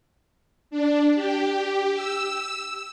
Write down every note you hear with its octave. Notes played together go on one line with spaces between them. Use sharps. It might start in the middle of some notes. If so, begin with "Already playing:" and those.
D4
G4
E6